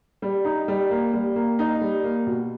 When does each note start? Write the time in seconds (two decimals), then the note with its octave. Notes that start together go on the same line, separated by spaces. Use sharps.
0.22 G3
0.45 D#4
0.68 G3
0.91 A#3
1.13 G3
1.36 A#3
1.59 D#4
1.81 G3
2.04 A#3
2.26 B2